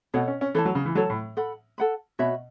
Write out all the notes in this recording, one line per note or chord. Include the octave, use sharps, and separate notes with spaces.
B2 A4 C#5 F#5
C#4
C#4
E3 A4 C#5 A5
F#3
C#3
E3
F#3 A4 C#5 A5
A2
A4 F#5 B5
A4 F#5 B5
B2 F#4 C#5 E5 B5